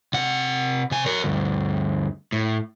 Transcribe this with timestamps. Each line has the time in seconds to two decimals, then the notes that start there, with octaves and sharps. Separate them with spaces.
0.13 C3 F#5
0.91 C3 G#5
1.06 A#4 C#5
1.24 D2 G2
2.32 A2